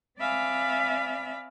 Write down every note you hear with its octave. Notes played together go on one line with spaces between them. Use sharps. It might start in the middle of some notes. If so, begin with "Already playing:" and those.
C4 D5 E5 F5 G#5 B5